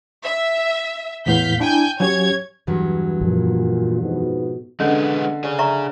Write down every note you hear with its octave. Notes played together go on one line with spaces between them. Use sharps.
E5
E2 A2 B3 F5 G6 B6
D4 E4 G5 G#5 G6
F#3 C#4 G4 C#5 G#6
E2 G2 F#3
F#2 A#2 F3
F2 G#2 B2
D3 G#3 B3 C#4 D#5
G#4 C#5 D5
D5 E5 A#5 C#6